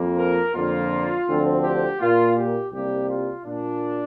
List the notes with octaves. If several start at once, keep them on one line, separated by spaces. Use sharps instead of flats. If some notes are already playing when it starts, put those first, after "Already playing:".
Already playing: F2 F3 A#3
A#4
F2 D3 A#3 F4
D2 D3 F3 C4
G4
A#2 A#3 F4
G4
C2 C3 G3 A#3 G4
F4
A#2 A#3 D4